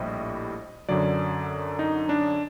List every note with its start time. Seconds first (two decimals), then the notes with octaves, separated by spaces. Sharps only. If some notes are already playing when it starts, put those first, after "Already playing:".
Already playing: A#1 A2 G3 D#5
0.89 F#2 D3 F#3 D5
1.79 D#4
2.09 D4